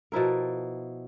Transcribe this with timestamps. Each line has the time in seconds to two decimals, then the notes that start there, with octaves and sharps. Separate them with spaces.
0.12 B2 F3 E4 A#4